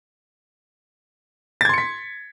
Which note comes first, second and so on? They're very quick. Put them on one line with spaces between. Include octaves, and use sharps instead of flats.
A6 G#6 C6 C#7 B6